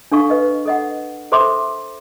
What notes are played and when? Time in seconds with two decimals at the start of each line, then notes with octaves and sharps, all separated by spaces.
0.12 D4 A4 F5 C#6
0.30 B4 D#5
0.66 A4 D#5 F#5
1.32 A4 C5 E5 C6 D6